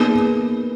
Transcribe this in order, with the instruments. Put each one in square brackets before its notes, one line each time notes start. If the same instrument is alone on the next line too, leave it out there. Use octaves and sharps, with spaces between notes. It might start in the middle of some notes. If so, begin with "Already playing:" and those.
Already playing: [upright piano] A#3 D#4 G#4 B4 [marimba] B3